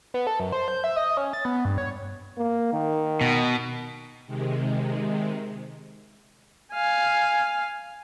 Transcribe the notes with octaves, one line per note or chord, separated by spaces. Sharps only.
B3
A4
F#2
C5
G6
E5
D#5
C#4
A6
B3
G2
C#5
A#3
D#3
B2
C3 D#3 G#3
F5 G#5